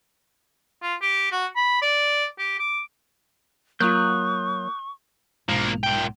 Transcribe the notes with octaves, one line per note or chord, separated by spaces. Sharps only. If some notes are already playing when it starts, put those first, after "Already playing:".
F4
G4
F#4
B5
D5
G4
D6
F#3 A#3 F4 C#6 D#6 F#6 G6
B1 G#2 F3 A#3
A#2 G5